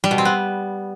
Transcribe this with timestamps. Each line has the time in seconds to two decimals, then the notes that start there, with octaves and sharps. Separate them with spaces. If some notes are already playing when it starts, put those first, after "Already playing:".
0.04 G3
0.11 B2
0.18 C4
0.25 B3